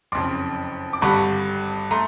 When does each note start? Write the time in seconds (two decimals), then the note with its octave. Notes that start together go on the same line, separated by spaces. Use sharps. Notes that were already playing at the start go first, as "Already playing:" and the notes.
0.12 F#1 F2 C#3 C6 D6
0.93 D6
1.02 G#1 G2 D3 G3 B5 C#6
1.91 A3 A#5 C6